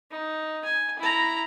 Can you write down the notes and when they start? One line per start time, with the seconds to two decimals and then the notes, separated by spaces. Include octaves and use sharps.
0.11 D#4
0.64 G#5
0.99 E4 A#5